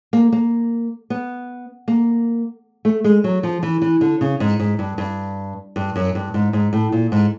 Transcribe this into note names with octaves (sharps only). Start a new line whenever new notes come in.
A#3
A#3
B3
A#3
A3
G#3
F#3
F3
E3
E3
D3
C#3
G#2
G#2
G2
G2
G2
F#2
G2
G#2
G#2
A2
A#2
G#2